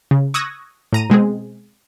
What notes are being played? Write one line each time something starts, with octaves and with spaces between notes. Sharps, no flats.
C#3
C#6 D#6 E6 F#6 G#6 A#6
A2 A#5 D#7
B2 G#3 C4 G#4